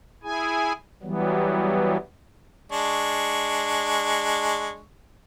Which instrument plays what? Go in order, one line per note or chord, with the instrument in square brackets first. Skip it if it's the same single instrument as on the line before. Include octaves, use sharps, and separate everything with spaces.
[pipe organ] E4 G#4 G#5
E3 F#3 G3 B3
[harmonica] G#3 D4 C#6